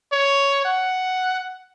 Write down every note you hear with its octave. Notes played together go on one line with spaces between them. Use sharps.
C#5
F#5